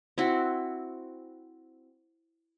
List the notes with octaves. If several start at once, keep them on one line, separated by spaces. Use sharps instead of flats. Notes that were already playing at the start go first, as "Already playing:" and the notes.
C4 E4 F#4